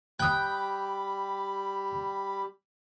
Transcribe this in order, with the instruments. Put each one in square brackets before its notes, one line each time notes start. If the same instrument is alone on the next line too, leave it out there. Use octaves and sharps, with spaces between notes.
[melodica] G3 G4 B5 [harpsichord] G5 [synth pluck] D#6 F#6